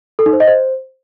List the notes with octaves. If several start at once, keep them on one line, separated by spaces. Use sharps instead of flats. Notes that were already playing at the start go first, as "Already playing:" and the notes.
A4
D#4
C5
D#5
C5